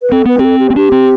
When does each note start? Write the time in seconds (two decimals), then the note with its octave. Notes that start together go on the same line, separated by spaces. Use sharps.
0.02 B4
0.12 C4 A4
0.26 B3 B4
0.39 C4 G4
0.45 A4
0.60 G4
0.70 C4
0.76 D4 G4
0.92 C4